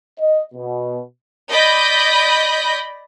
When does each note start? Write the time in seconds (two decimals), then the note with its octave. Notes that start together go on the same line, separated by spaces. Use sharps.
0.19 D#5
0.54 B2
1.50 D5 D#5 B5 G6 A#6